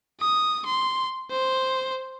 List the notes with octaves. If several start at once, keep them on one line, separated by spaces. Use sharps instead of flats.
D#6
C6
C5